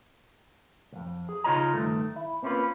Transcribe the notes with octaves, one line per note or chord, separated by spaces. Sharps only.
C2 F2
G#4
C#3 D#4 F4 C#5 D#5 A#5
D2 G2 D#3 A3
E4
A#3 C4 C#4 D#4 F4 B4